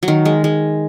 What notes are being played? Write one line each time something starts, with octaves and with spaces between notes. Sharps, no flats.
F#3
D#3
G#3
G#3